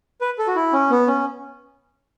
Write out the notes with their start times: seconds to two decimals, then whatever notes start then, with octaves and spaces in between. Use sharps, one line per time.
0.21 B4
0.38 A4
0.47 F#4
0.56 E4
0.73 C#4
0.90 B3
1.07 C#4